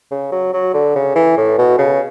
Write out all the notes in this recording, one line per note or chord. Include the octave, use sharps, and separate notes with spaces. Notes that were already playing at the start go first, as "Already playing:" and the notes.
C#3
F#3
F#3
D3
C#3
E3
A2
B2
C#3